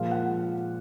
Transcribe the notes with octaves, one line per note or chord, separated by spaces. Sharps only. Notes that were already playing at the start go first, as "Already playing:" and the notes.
Already playing: A#2 F3 G#3 F5
F#5